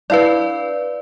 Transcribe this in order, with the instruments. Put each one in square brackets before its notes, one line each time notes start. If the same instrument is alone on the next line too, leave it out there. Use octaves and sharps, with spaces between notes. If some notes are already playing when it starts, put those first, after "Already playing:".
[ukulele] D4 E4 F5 [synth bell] B4 D5